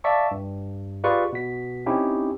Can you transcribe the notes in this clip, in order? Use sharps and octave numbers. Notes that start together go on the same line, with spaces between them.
D5 E5 F5 A5 C#6
G2
F4 G4 G#4 B4 D5 C#6
B2 B6
C4 C#4 D#4 E4 G4